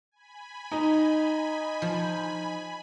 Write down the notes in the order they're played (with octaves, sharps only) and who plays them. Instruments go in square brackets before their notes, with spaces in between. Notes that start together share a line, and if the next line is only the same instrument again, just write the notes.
[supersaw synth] G#5 B5
[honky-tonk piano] D#4
[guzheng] F3